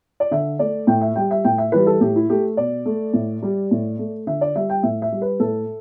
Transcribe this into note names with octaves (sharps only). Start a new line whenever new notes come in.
D5
D3 E5
A3 D5
A2 G5
E5
G3 G5
E5
A2 G5
E5
E3 G3 B4
A4
A2 G4
E4
A3 G4
B2 D5
A3
A2
G3
A2
A3
D3 E5
D5
G3 E5
G5
A2 E5
E5
G3
B4
A2 A4